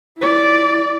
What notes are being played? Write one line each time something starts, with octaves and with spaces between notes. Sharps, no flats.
E4 D5